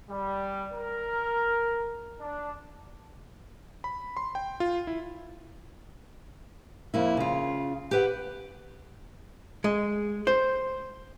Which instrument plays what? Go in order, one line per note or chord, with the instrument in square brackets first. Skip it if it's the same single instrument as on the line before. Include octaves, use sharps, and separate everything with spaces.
[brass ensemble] G3
A#4
D4
[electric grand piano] B5
C6
G5
F4
E4
[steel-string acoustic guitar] F2 A#3 E4
C#3 F4
G4 B4 F#5
[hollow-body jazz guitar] G#3
C5